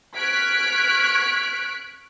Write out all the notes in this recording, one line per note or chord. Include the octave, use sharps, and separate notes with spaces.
C#6 F6 F#6 G#6 B6 D7